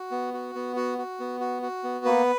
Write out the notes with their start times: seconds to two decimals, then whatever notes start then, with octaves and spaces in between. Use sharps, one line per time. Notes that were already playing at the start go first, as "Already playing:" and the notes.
Already playing: F#4
0.11 B3
0.34 F#4
0.55 B3
0.76 F#4
0.98 F#4
1.20 B3
1.41 F#4
1.62 F#4
1.84 B3
2.05 A#3 B4